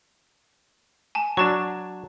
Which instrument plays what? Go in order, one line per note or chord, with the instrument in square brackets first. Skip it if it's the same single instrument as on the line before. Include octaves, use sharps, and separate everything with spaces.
[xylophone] G#5 A5
[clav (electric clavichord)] F#3 D4 [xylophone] A5 C#6